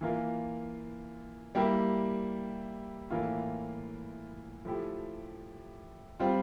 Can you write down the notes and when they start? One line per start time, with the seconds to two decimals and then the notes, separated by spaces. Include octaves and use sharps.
0.01 E3 A#3 F4
1.55 G3 A#3 E4 G4
3.10 A2 E3 A#3 F4
4.65 F3 A3 E4 G4
6.19 G3 C4 F4